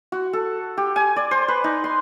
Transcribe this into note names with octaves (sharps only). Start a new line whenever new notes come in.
F#4
A4
G4
G#5
D5
C5
B4
D#4
C6